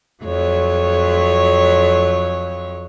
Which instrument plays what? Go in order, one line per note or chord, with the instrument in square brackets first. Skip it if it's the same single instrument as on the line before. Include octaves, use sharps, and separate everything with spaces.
[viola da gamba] F2 F#3 C#5